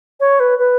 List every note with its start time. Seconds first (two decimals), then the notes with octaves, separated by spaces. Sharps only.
0.20 C#5
0.40 B4
0.59 B4